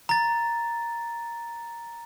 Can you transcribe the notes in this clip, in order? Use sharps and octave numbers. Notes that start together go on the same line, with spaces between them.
A#5 A6